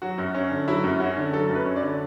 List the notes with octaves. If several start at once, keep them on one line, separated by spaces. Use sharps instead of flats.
F#3 F#4
F#2
C#4
D3
F#3 E4
F#2
C#4 F#4
D3
F#3 A4
F#2
B4
C#4
D5
D3